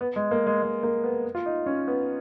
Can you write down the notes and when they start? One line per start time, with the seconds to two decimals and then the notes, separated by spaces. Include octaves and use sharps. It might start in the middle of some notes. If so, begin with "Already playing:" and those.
0.01 B3
0.16 G#3
0.31 A#3
0.47 G#3
0.63 G#3
0.83 A#3
1.04 B3
1.35 F4
1.46 D#4
1.66 C#4
1.87 B3